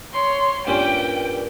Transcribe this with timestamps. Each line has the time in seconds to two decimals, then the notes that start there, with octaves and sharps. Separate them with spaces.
0.13 C#5 C6
0.67 G2 A#2 C#4 G5